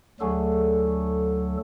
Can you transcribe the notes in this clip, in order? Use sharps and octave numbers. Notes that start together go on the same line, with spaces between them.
D2 D3 F#3 A3 G#4 A4